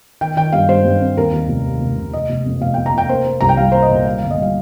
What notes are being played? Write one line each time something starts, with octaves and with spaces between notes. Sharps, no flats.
D#3 G5
D#3 G5
G2 F5
G2 C5
G2
C4
D#2 A#4
D#2
F1
D#2
F1
F1
F1 D#5
F1
F2
F1 F5
G5
F1
A#5
F1 G5
A#3 C5
A#3
C2 A#5
G5
G3 F5
A#3 C5
D#5
A#2
G3 F5
F5
G1
D#5
G3 F5